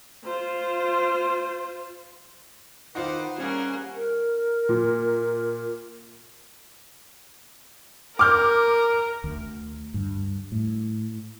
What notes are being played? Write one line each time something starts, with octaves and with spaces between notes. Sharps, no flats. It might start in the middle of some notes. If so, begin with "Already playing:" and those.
F4 C5
D#3 D#4 F4 B4 C5 F#5 D6
G3 A#3 C#4 G#4 C#5 F#5
A#4
A#2
A#4 D6 F6 G6
D2
G2
A2